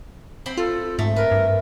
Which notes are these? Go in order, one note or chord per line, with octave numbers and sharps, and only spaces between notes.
C4 G5 B5
F4 A4
G#2 A3
A#4 B4
G2